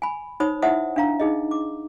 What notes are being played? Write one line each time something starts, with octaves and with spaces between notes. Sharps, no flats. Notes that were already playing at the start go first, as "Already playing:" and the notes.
G#5 B5
D#4 C5 C#5 B5 D#6
E4 C5 E5 F#5 D#6
D4 F5 A#5
D#4 G#4 D#5
D6